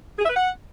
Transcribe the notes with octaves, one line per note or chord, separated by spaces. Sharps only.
G#4
E5
B4
F#5